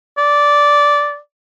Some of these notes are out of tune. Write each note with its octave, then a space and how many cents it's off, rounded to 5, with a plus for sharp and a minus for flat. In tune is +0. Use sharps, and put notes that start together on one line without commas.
D5 -10